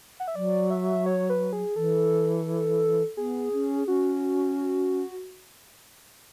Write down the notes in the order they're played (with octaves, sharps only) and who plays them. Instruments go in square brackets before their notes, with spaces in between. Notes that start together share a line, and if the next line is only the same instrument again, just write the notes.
[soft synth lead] F#5
E5
[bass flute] F#3 [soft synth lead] D5
[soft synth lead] E5
C#5
B4
G#4
[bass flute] E3 [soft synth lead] A4
[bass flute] B3 [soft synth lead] G#4
[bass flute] C#4
[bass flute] C#4 [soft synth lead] F#4